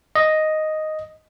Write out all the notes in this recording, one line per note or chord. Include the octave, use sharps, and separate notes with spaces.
D#5